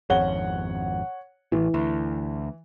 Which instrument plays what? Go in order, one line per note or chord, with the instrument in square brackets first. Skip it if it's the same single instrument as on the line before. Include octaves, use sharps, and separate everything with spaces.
[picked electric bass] G#1 F2 [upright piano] C#5 F#5 G7
[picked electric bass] A1 [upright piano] E3
[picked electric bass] D2